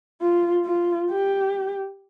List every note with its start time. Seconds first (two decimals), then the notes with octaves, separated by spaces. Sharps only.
0.21 F4
0.65 F4
1.10 G4